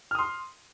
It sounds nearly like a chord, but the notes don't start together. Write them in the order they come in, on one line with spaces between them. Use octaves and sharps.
F6 D#6 C6